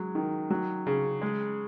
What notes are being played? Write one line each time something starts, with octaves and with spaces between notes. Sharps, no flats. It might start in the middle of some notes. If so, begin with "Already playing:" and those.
Already playing: F#3 G#3
D#3
F#3
C#3
G#3